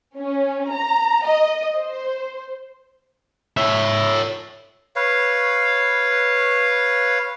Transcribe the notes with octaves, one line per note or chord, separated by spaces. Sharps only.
C#4
A#5
D#5
C5
C#5 E5
B4 C#5 F5